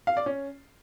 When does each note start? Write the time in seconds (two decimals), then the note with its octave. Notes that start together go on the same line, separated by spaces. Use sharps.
0.07 F5
0.17 D5
0.26 C#4